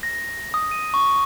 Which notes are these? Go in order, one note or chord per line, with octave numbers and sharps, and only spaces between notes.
A#6
D#6
D#7
C#6